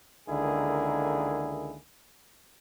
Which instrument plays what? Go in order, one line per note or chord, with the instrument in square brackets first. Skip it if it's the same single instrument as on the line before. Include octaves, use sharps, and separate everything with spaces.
[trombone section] C#2 D3 D#3 A#3 E4 G#4